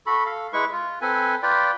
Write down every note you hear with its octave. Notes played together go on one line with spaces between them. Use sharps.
F#4 A4 B5
A4 F5
G#3 E4 B4 C#6
F4
C4 A4 B4 G#5
F4 B4 D5 G5